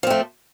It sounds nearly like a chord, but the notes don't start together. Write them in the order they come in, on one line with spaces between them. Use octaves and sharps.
F3 C4 A3